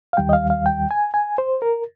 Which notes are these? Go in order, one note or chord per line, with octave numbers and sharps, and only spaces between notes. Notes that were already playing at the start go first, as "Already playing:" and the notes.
F5
D#2 D#3 G3 G5
D#5
F5
F5
G5
G#5
G#5
C5
A#4